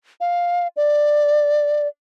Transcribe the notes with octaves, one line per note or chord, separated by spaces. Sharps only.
F5
D5